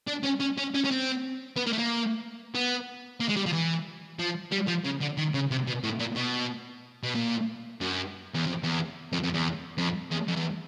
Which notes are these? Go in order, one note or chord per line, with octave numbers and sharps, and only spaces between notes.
D4
C#4
C#4
C#4
C#4
C#4
C4
B3
A#3
A3
A#3
B3
A#3
G#3
G3
F3
E3
F3
G3
F3
C#3
D3
D#3
C#3
C3
B2
A2
A#2
B2
B2
A#2
F#2
E2
F2
E2
F2
F2
E2
F2
E2
F2
E2